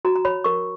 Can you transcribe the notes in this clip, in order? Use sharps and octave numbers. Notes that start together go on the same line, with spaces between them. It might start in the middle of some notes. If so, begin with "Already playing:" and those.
F#4 A#5
A#5
C#5 B5
A#4 C#6